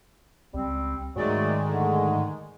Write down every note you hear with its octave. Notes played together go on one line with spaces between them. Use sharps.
C#2 G3 C4
G#2 D#3 F#3 G#3 A3 D5
D3 A3